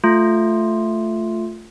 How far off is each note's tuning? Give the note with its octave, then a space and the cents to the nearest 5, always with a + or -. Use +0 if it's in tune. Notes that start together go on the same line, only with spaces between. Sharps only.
A3 +0 F4 +0